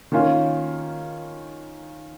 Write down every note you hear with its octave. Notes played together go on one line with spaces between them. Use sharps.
D#3 A#3 C#4 F4